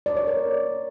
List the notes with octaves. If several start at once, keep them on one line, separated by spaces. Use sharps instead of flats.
D5
C#5
A#4